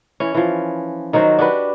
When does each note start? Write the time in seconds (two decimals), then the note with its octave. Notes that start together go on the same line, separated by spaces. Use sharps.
0.20 E3 C#4
0.34 E3 F3
1.13 D#3 F#3 F#4 C5
1.38 D4 F#4 G4 B4